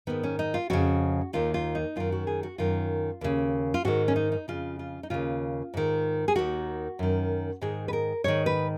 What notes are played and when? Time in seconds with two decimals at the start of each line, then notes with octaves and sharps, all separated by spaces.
0.07 G#2 D#3 B3
0.23 C#4
0.39 D#4
0.54 F4
0.70 F2 C#3 F#4
1.33 D#2 D#3 F4
1.54 F4
1.75 D#4
1.96 F#2 D#3 F4
2.12 F#4
2.27 G#4
2.43 F#4
2.58 F#2 D#3 F4
3.21 D#2 C#3
3.74 F4
3.85 G#2 D#3 F#4
4.08 C#4
4.16 D#4
4.32 D#4
4.48 F2 C#3 F4
4.79 F4
5.03 D#4
5.10 D#2 C#3 F4
5.74 G#2 D#3
6.28 G#4
6.36 D#2 D#3 F#4
6.99 F#2 D#3
7.61 G#2 D#3 G#4
7.88 B4
7.93 A#4
8.24 G#2 D#3 C#5
8.46 B4